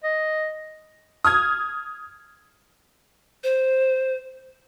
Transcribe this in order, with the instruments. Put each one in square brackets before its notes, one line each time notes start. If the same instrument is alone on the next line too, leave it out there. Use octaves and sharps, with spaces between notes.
[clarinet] D#5
[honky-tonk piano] D#6 F6 G#6
[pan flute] C5